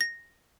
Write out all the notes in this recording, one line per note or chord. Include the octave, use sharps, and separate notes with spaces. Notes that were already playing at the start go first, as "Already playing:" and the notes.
A#6